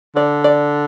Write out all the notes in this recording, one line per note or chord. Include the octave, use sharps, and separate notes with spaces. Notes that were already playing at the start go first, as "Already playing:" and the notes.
D3 D5
D5